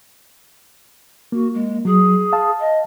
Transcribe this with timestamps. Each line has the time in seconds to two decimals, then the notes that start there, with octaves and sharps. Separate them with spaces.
1.32 A#3 F#4
1.53 G#3
1.85 F#3 G#4
2.33 F5 A5
2.59 D#5